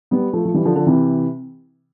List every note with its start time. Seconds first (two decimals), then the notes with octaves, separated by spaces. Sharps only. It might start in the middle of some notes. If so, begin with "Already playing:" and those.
0.11 G3 B3
0.33 F3 A3
0.45 F3
0.54 E3 G3
0.65 D3 F3
0.76 D3 F3
0.87 C3 E3